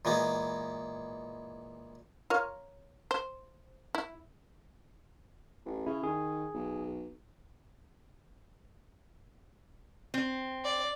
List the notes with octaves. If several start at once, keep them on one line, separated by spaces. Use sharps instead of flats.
A#2 E3 G#3 B3
F4 A#4 C#5
C5
E4
A1
C#3 E4
D#3 G#4
B1
C4
D5